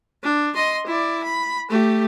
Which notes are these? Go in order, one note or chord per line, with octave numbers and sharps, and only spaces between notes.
D4
D#5 C6
E4 D5
B5
A3 G4